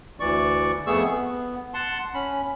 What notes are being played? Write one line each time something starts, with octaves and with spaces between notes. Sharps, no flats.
D2 E3 D5 C#6
F2 A3 B3 G#4 C#6 E6
B3
F#5 A5 C6
C#4 B5